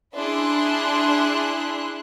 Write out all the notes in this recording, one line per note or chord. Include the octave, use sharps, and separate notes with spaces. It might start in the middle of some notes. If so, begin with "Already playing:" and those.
D4 E4 G#4 C6 F#6